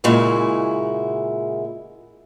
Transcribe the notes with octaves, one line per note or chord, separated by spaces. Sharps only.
A#2 C#3 G#3 E4 F#4